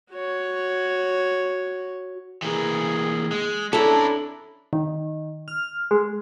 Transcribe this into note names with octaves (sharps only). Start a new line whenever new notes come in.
F#4 C#5
E3 A#3 G#4
G#3
C#4 D4 E4 A4 A#5 B5
D#3
F6
G#3